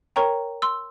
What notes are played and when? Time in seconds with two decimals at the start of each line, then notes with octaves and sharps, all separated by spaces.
0.16 A#4 C#5 G5 A#5 C#6
0.62 C6 E6